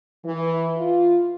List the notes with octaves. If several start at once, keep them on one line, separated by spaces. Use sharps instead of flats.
E3
F4